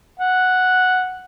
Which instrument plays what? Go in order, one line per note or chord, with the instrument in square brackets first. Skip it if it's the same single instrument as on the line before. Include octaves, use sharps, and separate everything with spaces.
[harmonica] F#5